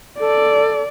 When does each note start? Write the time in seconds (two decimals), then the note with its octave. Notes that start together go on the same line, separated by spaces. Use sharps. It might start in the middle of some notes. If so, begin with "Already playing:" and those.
0.19 A4 D5